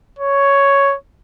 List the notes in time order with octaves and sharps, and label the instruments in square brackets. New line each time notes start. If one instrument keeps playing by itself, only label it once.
[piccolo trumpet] C#5